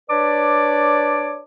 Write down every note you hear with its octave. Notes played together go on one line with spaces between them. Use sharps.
D4 B4 C#5 D5 A5 D6